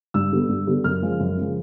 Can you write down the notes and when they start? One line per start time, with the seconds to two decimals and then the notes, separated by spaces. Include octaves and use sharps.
0.14 G2 E6
0.32 D3 G3 B3
0.49 G2
0.67 D3 G3 B3
0.84 F#2 F6
1.02 C#3 F3 G#3
1.20 F#2
1.37 C#3 F3 G#3